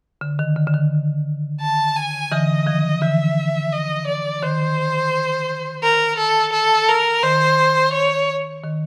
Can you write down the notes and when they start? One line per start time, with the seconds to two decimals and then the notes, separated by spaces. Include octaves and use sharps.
0.21 D3
0.39 D#3
0.56 D3
0.67 D3
0.74 D#3
1.61 A5
1.96 G#5
2.32 D3 E3 D#5
2.66 D#3 F3
3.02 D3 E3 E5
3.72 D#5
4.07 D5
4.42 D#3 C5
5.83 A#4
6.17 A4
6.52 A4
6.88 A#4
7.23 D#3 C5
7.93 C#5
8.64 D#3